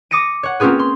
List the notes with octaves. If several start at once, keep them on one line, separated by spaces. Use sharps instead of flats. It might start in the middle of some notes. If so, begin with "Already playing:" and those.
D6 D#6 A#6 C#7 D#7
C#5 F#5
A#3 C4 C#4 F4 G#4 B4
C6